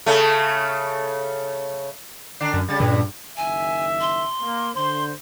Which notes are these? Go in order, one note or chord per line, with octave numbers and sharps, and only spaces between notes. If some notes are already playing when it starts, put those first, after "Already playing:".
C#3 A3
D3 D4 C7
F#2
C#3 G3 A6
G2 A#2
F#1 D#3 E5 G#5
C6
A#3
D3 C5 C6